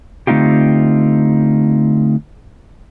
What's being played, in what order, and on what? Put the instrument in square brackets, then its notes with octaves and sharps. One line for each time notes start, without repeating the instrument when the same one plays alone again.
[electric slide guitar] D3 A3 C4 D#4 F4 G4